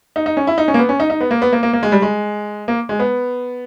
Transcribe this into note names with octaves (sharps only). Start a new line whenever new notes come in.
D#4
D#4
C#4
E4
D#4
C#4
A#3
B3
C#4
D#4
D#4
B3
A#3
B3
A#3
A#3
A#3
G#3
G3
G#3
A#3
G#3
B3